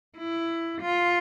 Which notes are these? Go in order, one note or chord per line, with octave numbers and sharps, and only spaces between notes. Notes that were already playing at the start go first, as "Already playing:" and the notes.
E4
F4